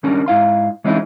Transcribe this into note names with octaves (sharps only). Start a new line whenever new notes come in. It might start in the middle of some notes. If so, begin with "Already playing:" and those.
D#3 G3 C#4 D4 A#4
G#2 E4 F5 C6
E3 G#3 C4 C#4 D#4 E4